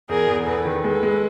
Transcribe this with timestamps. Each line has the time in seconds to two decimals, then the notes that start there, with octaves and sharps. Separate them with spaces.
0.09 E2 G#4 A#4
0.28 E2
0.46 E2 A4 B4
0.65 D#3
0.83 G#3 A4 B4
1.03 G#3